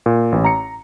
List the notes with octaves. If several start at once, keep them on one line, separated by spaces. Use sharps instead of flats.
A#2
A1
A#5 C#7